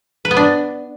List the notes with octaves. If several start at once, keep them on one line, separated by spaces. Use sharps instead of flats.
B4
B3
D4